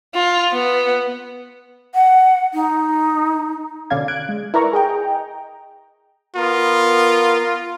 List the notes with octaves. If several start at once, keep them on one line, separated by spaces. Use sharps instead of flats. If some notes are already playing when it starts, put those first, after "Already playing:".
F4
B3
F#5
D#4
B2 D3 C#4 D5 F5 G#6
F#6 G#6 D7
G#3
E4 A#4 B4 D5 A#5 C#6
G#4 D#5 G5 A#5
B3 F4 A#4